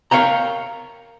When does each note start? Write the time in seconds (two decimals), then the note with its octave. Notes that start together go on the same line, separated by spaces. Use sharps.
0.11 A#4 C#5 F5 G5 A#5